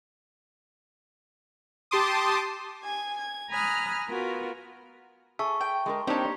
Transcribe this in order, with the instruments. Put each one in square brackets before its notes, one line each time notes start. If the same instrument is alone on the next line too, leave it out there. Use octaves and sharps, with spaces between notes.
[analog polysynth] G4 A5 C6 D6 D#6
[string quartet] G#5 G#6
G#6
G#5 A#5 B5 D#6 F6 F#6
B3 F4 F#4 A#4
[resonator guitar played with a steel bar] G#4 [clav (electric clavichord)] E5 [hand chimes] A5 C#6
[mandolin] G5
[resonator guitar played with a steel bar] G#3 A4 A#4
[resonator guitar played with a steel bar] A#3 D#4 C5 [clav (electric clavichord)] C4 D4 [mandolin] G4 C#5